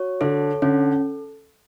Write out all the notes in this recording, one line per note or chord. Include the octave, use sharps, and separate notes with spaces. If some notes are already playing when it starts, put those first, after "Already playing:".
Already playing: F#4 C#5
D3 A4
D3 C#4